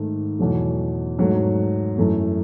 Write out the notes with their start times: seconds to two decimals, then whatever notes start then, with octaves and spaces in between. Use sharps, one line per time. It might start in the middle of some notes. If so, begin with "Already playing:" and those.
Already playing: G#2 D#3 A3
0.39 E2 B2 F#3 A3
1.18 G#2 F#3 A3
1.98 F#2 E3 A3